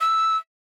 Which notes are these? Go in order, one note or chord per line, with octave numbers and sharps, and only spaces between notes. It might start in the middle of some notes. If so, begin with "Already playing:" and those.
E6